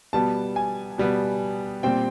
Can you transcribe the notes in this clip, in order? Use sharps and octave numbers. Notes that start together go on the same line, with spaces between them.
B2 G3 B3 A5
G#5
B2 G3 B3
A#2 G3 C4 G5